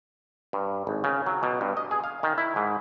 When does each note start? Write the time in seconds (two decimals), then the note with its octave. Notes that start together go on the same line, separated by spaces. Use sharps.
0.53 G2
0.87 G#1
1.04 C#3
1.26 F#3
1.43 B2
1.61 G2
1.77 D#5
1.91 G#4
2.04 F5
2.23 D#3
2.38 E4
2.56 G#2